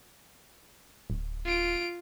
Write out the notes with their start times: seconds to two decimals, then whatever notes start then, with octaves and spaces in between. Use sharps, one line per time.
1.10 D1
1.45 F4 D7